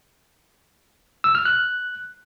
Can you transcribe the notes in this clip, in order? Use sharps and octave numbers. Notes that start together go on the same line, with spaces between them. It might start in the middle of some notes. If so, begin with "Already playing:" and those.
E6
F6
F#6